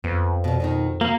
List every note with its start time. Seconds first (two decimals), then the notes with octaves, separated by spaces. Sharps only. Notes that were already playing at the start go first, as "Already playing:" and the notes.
0.04 F2 B3
0.44 E2 B2
0.60 B2 D#3 D#4
1.01 A#3 F#4